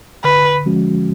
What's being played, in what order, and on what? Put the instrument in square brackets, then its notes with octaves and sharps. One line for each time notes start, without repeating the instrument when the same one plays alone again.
[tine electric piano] D3 [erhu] B4
[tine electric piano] F3 G#3 C#4 F#4